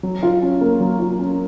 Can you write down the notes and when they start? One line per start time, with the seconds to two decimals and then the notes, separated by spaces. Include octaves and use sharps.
0.03 F#3
0.23 F4
0.42 C#4
0.61 A#3
0.80 F#3
1.00 F4
1.19 C#4